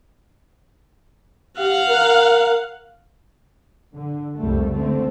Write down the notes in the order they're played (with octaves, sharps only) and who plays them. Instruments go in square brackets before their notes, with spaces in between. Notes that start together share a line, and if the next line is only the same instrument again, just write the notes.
[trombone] G4 [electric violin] F5 F#5
[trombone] A#4
[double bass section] D3
C2 F2 G3 A3
C#2 D3 A3 C4